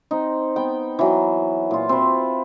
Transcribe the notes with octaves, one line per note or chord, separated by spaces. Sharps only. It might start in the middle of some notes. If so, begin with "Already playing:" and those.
C4 D#4
B3 G5
E3 F#3
A#2 F4
C4 B4